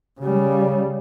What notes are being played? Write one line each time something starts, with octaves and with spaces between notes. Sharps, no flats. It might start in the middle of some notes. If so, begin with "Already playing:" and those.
C#3 G3